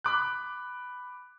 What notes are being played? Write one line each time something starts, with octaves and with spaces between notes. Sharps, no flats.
B5 D6 F#6